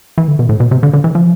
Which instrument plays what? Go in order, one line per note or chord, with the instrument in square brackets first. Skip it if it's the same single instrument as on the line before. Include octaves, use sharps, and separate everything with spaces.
[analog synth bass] E3
D3
B2
A2
B2
C3
D3
D3
E3
F3